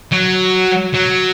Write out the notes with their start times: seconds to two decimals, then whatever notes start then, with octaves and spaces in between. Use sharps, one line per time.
0.12 F#3
0.95 F#3